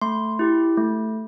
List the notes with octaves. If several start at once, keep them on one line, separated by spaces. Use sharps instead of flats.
A3 C6
E4 G4
A3